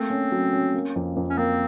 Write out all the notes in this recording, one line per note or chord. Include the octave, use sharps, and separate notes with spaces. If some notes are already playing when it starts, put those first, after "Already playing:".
Already playing: A3 A#3 C4
C#4
F#3
C#4
A#3
F2
F2
C#4
A#3 C4